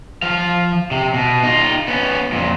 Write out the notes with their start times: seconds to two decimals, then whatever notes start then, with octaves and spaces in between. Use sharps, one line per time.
0.22 F3 F5
0.91 C3
1.14 B2
1.43 D#4 F4
1.88 B3 C#4
2.32 F2 A#2